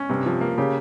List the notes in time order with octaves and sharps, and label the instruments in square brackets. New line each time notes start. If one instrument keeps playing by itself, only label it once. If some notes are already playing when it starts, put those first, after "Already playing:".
Already playing: [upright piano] C#4
[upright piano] G2 [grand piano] C3
[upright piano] F3
A#3
[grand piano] C#3 [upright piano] G4